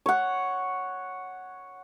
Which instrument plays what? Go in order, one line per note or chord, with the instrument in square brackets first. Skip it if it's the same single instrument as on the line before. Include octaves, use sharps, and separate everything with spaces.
[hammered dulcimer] C#5 F#5